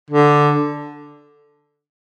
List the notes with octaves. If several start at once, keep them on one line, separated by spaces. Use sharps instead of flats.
D3